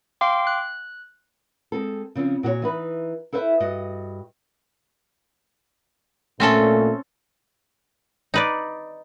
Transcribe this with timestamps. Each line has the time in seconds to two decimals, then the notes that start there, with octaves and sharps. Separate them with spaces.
0.21 F5 G5 C6 D6
0.47 F#6
1.72 G#3 C4 A4
2.15 C#3 F3 C4 C#4
2.43 A#2 F#4 A4 C#5
2.62 E3 D#4 B4
3.33 E4 A4 B4 C5 E5
3.60 G2 F#4 D#5
6.40 A#2 A3 C4 C#4 A4
8.34 D#4 B4 D5